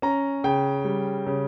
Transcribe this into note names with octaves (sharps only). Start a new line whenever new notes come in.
C#4 A#5
C#3 G5
G3
C#3